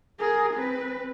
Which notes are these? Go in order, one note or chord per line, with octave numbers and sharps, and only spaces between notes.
G#4 A#4
C4 B4